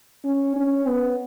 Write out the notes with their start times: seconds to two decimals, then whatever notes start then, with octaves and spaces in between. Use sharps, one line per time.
0.25 C#4
0.56 C#4
0.87 B3